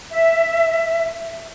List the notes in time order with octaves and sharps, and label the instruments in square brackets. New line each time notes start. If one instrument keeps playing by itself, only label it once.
[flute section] E5